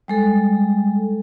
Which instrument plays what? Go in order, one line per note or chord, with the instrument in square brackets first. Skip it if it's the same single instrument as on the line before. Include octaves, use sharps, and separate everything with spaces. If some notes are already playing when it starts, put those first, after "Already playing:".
[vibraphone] G3 G#3 A4